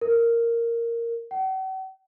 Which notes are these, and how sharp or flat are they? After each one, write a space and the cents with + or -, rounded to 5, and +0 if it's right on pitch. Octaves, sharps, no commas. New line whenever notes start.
A#4 -5
F#5 +45